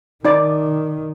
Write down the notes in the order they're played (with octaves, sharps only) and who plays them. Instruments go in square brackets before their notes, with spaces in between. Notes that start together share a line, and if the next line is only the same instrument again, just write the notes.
[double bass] D#3 [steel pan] D#4 D5